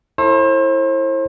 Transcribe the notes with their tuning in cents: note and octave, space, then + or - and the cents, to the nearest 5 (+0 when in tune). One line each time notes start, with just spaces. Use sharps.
E4 +0 A4 +20 C5 +40